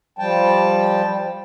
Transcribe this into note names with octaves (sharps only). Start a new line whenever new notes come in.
F3 G3 G5 A5